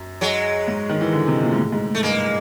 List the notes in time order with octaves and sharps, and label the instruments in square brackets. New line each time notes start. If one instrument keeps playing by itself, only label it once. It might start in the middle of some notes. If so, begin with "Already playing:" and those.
Already playing: [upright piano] F#2
[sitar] F#3 G#3
[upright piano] G#2
D#3
E3
D3
C3
A#2
G#2
A2
G#2
A2
[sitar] A3
[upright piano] G2 [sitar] G#3 A#3